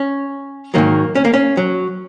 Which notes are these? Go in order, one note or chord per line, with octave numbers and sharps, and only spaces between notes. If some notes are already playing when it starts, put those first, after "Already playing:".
Already playing: C#4
G#2 D#3 F#3 A#3
C#4
A#3
C#4
F#3